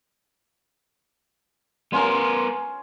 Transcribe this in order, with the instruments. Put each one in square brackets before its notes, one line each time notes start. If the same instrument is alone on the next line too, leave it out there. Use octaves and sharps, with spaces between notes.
[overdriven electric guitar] B3 A#4 [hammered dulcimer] C#4 F4 C6